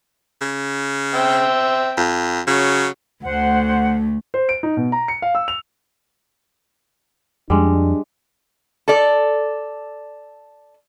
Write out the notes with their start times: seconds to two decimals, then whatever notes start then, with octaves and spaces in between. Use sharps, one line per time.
0.41 C#3
1.14 C4 E5 G5
1.97 F2
2.47 C#3 F#3
3.24 D2 A3 C5 F#5
4.34 C5
4.49 D7
4.63 D#4
4.77 B2
4.92 A#5
5.08 C#7
5.22 F5
5.35 E6
5.48 F7
7.50 F2 G3 G#3 D4
8.88 A4 D5